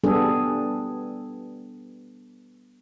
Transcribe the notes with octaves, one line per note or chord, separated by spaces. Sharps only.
G3 B3 D4 G#4 A4